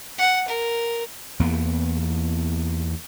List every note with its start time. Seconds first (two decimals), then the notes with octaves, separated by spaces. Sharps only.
0.18 F#5
0.48 A#4
1.40 E2 A#3 B3